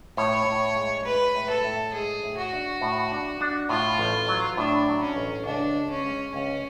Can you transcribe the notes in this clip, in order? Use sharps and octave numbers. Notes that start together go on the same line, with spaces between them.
A2 C#5
A2
G#3
G#3 B4
A2
A4
A2
G#3 G#4
A2
F#4
D4
A2
D4
D4
A2 F4
A1
F#3
A2 D4
F#3
C#4
A1
C#2 D4
G#3
C#4
G#3
C#2 C#4